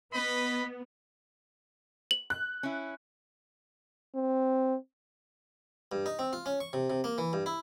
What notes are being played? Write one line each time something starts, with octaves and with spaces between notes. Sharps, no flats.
B3 B4 D#5 B5
F#7
F#6
C#4 E4
C4
G2
D#4
C4
F4
C#4
C#6
C3
C3
A#3
E3
G2
E4